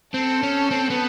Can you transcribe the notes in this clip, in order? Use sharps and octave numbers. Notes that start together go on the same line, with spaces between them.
C4 A4
C#4
C4
B3